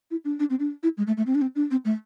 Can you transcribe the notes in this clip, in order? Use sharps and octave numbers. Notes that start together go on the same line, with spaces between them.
E4
D4
D4
C4
D4
E4
G#3
A3
A3
C4
D4
C4
D4
C4
A3